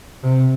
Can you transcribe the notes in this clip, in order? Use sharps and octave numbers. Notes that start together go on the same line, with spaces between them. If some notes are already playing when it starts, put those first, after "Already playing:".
C3